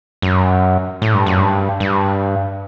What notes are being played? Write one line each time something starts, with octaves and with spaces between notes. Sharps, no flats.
F#2
A2
G2
F#2
G2
G2